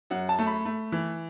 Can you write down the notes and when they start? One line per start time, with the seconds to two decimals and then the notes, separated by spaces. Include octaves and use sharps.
0.10 F#2 F#5
0.29 A5
0.39 A3
0.47 B5
0.65 A3
0.92 E3